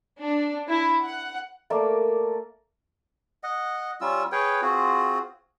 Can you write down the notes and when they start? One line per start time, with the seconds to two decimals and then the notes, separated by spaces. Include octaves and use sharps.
0.22 D4
0.68 E4
1.04 F#5
1.70 A3 A#3 A#4 D5
3.43 D#5 F#5
4.01 G3 C#4 F4 E6
4.32 G#4 B4 C#5 G5
4.62 C4 F4 F#4 G#4